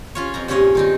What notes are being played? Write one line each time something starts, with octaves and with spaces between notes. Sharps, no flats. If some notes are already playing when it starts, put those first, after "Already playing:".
C#4 F4 C#5
F2 C4 A#5
G2 A#2 C#4 G#4 C#5 D#5
D#3 C4 D#4